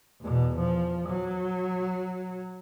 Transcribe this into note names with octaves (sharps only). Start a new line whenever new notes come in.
E2 B2
F3
F#3